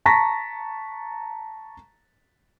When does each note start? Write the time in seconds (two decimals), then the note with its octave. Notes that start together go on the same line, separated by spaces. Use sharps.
0.06 A5 A#5 C#6 A#6 B6